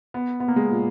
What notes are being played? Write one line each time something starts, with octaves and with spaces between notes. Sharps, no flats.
B3
B3
A#3
G#3
A#2